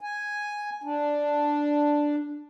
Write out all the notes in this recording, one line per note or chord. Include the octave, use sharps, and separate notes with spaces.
G#5
D4